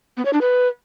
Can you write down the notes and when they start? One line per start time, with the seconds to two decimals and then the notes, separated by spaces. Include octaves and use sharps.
0.17 B3
0.25 C#5
0.33 D4
0.41 B4